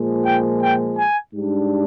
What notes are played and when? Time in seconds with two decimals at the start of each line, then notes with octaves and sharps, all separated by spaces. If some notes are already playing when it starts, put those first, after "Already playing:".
Already playing: A#2 F3 G#3
0.26 G5
0.63 G5
0.97 G#5
1.34 G#2 G3 D4